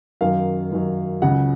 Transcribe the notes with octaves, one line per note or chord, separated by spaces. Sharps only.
F#2 D#3 F#3 F5
F#2 D#3 F#3
C#2 C#3 F#3 F#5